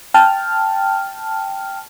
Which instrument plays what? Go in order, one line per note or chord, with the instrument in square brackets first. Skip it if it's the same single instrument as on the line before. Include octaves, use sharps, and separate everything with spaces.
[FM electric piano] G5 A5 F6